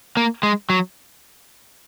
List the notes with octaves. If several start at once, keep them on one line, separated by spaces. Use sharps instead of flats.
A#3
G#3
F#3